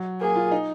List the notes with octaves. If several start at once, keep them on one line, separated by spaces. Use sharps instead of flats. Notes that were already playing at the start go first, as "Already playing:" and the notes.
Already playing: F#3
A#3 G#4
F4
D#4